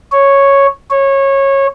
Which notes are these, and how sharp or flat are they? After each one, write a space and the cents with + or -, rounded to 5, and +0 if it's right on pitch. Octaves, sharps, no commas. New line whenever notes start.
C#5 -5
C#5 -20